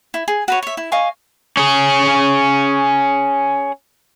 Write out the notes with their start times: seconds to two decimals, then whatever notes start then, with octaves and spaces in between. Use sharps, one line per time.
0.14 E4
0.28 G#4
0.48 F#4 B4 C#5
0.63 C#5 E5
0.77 E4
0.92 D#5 F5 G#5 C#6
1.57 C#4 G#4